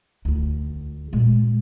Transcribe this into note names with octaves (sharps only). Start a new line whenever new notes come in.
D2 F4
A#2 G#3